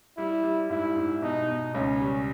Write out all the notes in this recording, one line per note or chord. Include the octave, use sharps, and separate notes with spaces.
G3 E4
G3
G#2 E4
G#2
B2 D#4
B2
C#2 C#4
G3